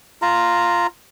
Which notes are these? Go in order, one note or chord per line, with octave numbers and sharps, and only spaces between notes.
F4 A#5